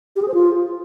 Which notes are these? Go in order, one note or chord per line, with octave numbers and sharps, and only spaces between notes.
G4
G#4
C5
F4